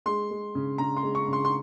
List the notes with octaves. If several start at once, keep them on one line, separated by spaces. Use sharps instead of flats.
G#3 C6
G#3
C#3
C#3 A#5
C6
G#3
C#6
C#3
C6
C6